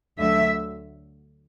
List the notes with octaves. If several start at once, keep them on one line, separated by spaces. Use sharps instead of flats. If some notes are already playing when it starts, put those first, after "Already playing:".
D2 D3 F#3 A3 E5